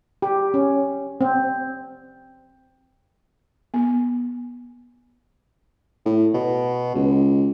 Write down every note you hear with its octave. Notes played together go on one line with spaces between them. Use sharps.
G4
C#4
C4
B3
A2
B2
C#2